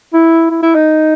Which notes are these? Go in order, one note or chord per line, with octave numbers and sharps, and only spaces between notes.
E4
E4
E4
D#4